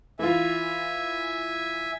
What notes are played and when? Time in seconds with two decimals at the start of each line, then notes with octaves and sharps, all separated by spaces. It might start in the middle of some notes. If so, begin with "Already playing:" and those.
0.19 E3 F4 E5 G#5